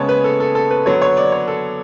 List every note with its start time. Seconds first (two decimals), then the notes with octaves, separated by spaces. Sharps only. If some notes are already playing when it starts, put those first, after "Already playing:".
Already playing: C#3 G#3 B3 C#5 A5
0.09 B4
0.24 A4
0.40 A4
0.55 A4
0.70 B4
0.86 D3 F#3 B3 C#5
1.02 C#5
1.17 D5
1.32 C#5
1.48 A4